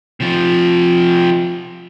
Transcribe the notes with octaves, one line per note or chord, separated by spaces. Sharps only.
C3 F3